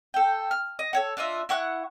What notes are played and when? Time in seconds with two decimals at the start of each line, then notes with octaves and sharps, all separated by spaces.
0.14 A4 G5
0.51 F6
0.79 D#5
0.93 A4 C#5 F#5
1.17 D4 F4 D#5 E5
1.49 E4 F#5 C#6 F#6